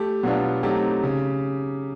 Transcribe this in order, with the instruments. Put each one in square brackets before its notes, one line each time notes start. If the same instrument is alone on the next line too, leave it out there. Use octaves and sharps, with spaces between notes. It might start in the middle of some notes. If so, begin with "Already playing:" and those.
Already playing: [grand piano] A3 G4
B2 F#3 B3 D4 F4
F#3 A3 C4 D#4 G4
C#3